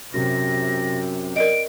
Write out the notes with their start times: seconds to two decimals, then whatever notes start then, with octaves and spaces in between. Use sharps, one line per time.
0.14 F#2 C3 A#6
1.36 A#4 D5 D#5 D7